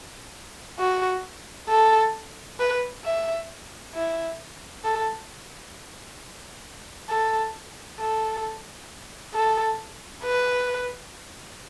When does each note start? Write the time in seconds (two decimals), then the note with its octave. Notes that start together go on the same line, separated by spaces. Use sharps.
0.79 F#4
1.69 A4
2.59 B4
3.05 E5
3.94 E4
4.85 A4
7.09 A4
7.99 A4
9.34 A4
10.24 B4